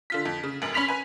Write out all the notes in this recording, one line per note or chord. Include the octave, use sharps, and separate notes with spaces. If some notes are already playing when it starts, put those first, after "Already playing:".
D3 F4 B6
F2
C#3
F1 F#2 F#7
C#4 B5 C6 B6 F7
B4 G#5